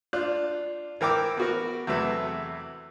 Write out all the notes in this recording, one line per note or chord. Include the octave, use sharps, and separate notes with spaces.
D4 F4 F#6
E3 A#4 G5 D6 E6
B3 F#4 A#4
E2 C3 F#3 A3 A4 B4